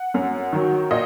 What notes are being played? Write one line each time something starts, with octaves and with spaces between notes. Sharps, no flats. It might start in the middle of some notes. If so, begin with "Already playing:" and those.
Already playing: F#5
F#2
D#3 F#3
A#2 D#5